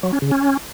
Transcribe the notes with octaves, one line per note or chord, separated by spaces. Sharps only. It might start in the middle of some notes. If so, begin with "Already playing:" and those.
F#3
C#4
C#3
C#4